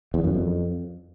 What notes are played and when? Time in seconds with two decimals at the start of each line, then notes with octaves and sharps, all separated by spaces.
0.14 E2
0.24 F#2
0.34 F2